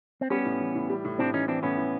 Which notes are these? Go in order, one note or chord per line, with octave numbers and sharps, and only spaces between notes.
C4
G3 B3 C#4
A2
E3
A2
G3
A2
A2 C4 D4
E3 C#4 D#4
E3 C4 D4
A2 B3 C#4
E3